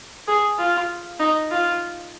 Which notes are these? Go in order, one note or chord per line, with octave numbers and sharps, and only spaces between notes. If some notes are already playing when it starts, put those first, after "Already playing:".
G#4
F4
D#4
F4